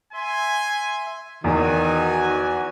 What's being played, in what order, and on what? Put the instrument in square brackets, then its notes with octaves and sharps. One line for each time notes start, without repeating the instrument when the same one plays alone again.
[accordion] E5 C6 [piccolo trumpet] G#5
[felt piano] E2 [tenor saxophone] D#3 [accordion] E3 F#4 [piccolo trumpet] G#5